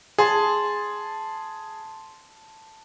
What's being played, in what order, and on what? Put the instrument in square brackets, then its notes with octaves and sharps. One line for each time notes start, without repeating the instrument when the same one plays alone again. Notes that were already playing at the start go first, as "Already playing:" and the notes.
[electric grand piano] G#4 [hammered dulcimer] A5 C6